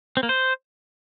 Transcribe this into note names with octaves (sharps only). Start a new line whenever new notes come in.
C4
A#3
C5